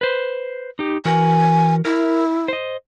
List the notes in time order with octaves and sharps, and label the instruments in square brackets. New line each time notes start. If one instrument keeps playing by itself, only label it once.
[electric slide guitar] B4 C5
D#4 G4
[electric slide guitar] E3 F#4 A#4 [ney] G#5
[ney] E4 [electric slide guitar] A#4
[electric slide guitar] C5 D#5